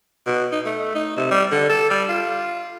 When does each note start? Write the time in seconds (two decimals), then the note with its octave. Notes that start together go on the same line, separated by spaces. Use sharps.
0.26 B2
0.52 D#4
0.65 A3
0.95 D#4
1.16 C3
1.31 G3
1.51 D3
1.69 A4
1.90 G3
2.09 F4